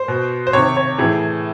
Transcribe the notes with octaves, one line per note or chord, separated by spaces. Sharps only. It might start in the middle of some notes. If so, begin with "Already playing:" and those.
Already playing: C5
B2
C5
C3 D#3 C#5
C#5
A2 E3 G#4